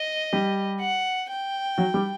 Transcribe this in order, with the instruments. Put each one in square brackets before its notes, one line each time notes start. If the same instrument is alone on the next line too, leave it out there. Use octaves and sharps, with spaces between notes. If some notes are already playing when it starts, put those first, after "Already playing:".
Already playing: [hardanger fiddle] D#5
[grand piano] G3 G4
[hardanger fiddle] F#5
G5
[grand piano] F#3 F#4
G3 G4